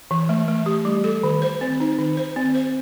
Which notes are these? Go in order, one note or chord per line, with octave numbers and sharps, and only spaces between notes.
E3
A3
A3
G4
G3
A4
D#3
C5
C4
D#4
D#3
C5
C4
C5